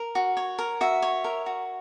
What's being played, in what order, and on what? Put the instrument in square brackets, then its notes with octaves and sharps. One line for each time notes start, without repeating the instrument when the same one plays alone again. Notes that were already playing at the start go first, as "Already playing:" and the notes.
Already playing: [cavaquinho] A#4
F#4
C#5
A#4
F#4 E5
C#5
A#4
F#4